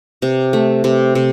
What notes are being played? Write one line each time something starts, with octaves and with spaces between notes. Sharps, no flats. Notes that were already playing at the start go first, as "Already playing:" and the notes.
C3
A3
C3
C3